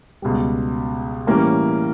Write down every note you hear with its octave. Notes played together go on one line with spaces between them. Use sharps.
C#2 B2 G3
A2 E3 G3 A#3 C#4